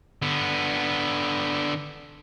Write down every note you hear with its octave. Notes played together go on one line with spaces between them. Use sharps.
D3 B3